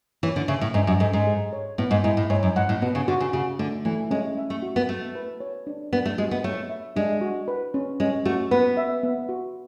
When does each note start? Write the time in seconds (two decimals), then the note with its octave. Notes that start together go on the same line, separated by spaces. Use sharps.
0.23 E3 C#5
0.36 D3
0.48 C#3 E5
0.61 A2
0.74 G#2 D4
0.87 F#2
1.00 G#2 A4
1.13 G#2
1.27 G#4
1.53 C#5
1.78 A2 B3
1.91 G#2
2.03 G#2 E4
2.17 A2
2.30 G#2 C#5
2.43 F#2
2.56 G#2 F#5
2.69 A2
2.82 B2 B3
2.95 C#3
3.08 D3 F#4
3.20 C#3
3.33 C#3 F#4
3.59 D3 A3
3.85 E3 A3
4.11 G#3 C#4
4.38 E5
4.50 A3
4.63 F#4
4.76 B3
4.89 A3 F#4
5.15 B4
5.40 C#5
5.67 D4
5.92 B3 D4
6.05 A3
6.18 G#3 F#4
6.31 B3
6.44 A3 C#5
6.70 E5
6.96 G#3 D4
7.21 F#4
7.48 B4
7.74 C#4
8.00 G#3 C#4
8.25 A3 F#4
8.51 B3 B4
8.77 E5
9.03 B3
9.29 F#4